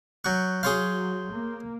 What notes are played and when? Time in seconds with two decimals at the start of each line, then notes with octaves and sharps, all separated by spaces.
0.25 F#3 C#6 F#6 G6
0.63 F#3 G#4 C#5 F5 C6 G6
1.31 A#3